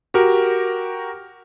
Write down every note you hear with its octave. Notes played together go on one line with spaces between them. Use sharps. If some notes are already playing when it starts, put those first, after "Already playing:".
F#4 G4 A#4